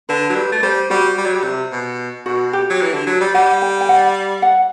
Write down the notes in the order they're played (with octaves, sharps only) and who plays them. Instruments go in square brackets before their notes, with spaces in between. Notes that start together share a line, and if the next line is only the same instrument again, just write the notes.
[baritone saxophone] D3 [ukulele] B4
[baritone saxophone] F#3
[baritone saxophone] G3 [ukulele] B4
[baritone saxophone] A3
[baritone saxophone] G3 [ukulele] C5
[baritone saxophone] G3 [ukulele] F#4
[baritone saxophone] G3
F#3
G3
C3
B2
[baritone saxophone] B2 [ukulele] F#4
[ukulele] G4
[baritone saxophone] F#3
E3
D3
F#3
G3
[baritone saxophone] G3 [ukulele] F#5
[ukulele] G5
G5
F#5
F#5